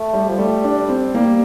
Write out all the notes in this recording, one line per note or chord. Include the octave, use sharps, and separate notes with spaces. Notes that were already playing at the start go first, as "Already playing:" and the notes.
Already playing: A3
G3
F3
G3 A3
D4
C4
G3 A#3